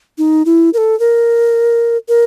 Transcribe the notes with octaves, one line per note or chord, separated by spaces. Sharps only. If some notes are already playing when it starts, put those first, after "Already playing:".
D#4
E4
A#4
A4
A#4
A#4